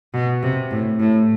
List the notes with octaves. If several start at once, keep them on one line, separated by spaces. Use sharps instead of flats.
B2
C3
A2
A2